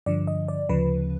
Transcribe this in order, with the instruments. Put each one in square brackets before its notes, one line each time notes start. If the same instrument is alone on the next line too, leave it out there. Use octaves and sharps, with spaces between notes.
[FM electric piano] G2 D3 F3 D5
D#5
D5
D2 C#3 F3 B4